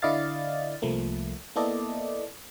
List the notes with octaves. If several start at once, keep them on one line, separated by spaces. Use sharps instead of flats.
D3 E4 D5 D#5 F5 A6
C2 F3 A3 A#3
A#3 B3 E4 A4 D5 D#5